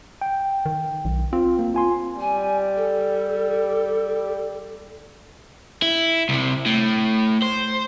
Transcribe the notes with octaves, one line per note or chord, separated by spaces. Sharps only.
G5
D#3
B1
C4 F4
A#3
F4 G#5 C6
G3 G#5
A4
E4
C2 C3
A2
C5